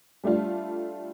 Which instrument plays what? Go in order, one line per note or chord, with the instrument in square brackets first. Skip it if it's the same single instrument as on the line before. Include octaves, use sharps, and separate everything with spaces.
[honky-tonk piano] G3 A3 D4 F4